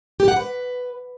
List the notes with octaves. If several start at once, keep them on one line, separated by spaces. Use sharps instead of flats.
G4
F#5
B4